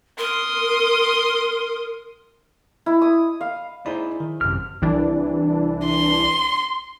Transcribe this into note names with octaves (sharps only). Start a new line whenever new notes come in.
A#4 C6 D#6
E4
D#6
F5
D#4 E4 G#4 C5 D5 B5
D#3
G#1 F#2 C3 F6
C2 E3 D4
C6